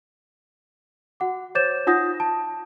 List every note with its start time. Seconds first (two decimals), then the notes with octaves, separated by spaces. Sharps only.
1.20 F#4 F#5 D6
1.55 C5 C#5 D6 G6 A6 E7
1.87 D#4 F4 F#5 D#6 G6 A#6
2.20 A5